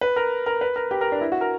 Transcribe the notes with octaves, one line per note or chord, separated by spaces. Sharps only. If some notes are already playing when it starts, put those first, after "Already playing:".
B4
A#4
A#4
B4
A#4
G4
A#4
D4
E4
F#4
A#4